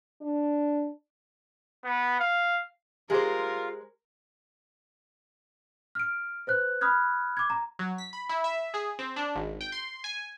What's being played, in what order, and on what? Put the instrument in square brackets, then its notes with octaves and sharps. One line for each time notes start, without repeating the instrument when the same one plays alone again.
[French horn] D4
[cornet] B3
F5
[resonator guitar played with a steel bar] G#3 C5 [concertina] F4 [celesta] G4 G#4 [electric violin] A#4
[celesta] F6 D7
B4 C5 F#6
B5 D#6 F6 F#6 G#6
D6 G#6
A#5
[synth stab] F#3
B6
B5
E4
E5
G#4
C4
D4
G#1
G5
C6
G#5